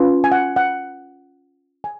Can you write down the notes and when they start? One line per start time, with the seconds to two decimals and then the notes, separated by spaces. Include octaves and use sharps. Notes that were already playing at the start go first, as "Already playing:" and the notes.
Already playing: C#4 F4 B4
0.24 G#5
0.32 F#5
0.56 F#5
1.84 G#5